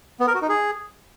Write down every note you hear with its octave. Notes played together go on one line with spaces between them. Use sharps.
B3
A#4
F#4
D#4
G#4